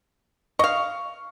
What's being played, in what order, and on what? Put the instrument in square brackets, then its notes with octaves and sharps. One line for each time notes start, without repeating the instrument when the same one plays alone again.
[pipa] D#5 F5 [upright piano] C#6